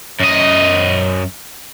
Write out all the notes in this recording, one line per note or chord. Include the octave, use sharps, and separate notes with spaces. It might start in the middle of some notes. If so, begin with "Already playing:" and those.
F#2 D#5